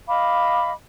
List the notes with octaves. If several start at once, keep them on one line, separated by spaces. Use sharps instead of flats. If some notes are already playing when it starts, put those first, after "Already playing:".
D#5 F5 B5 D6